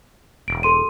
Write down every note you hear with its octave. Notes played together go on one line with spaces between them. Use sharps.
E1 D7
A4 C6 D#7